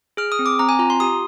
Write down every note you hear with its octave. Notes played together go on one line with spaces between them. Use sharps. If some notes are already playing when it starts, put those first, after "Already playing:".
G#4 F6
D#6
C4
D6
C4 A#5
G#5
F4 A#5
C6
G4 D#6